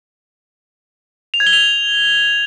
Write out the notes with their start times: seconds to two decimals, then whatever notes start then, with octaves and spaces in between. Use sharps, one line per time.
1.34 F7
1.40 G#6
1.47 G7
1.53 F7